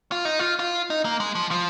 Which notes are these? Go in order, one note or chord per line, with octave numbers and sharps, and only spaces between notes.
F4
D#4
F4
F4
D#4
A#3
G#3
F3
F3